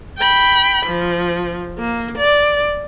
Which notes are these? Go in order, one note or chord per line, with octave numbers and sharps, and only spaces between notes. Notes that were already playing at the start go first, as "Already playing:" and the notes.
G5 B5
F3
A#3
D5